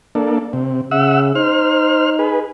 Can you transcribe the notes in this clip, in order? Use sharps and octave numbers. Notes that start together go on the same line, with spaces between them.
A#3 D4 A4
C3
C#3 E5 F#5 E6
D#4 C5 F6
G#4 B4